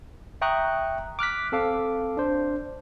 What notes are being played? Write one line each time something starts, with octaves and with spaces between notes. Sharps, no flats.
E5 G5 A#5 C#6 D#6 F#6
D6 F6 F#6 B6
C4 A4 F5 D6
D4 C5